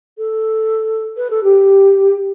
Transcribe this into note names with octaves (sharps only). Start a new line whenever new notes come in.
A4
B4
A4
G4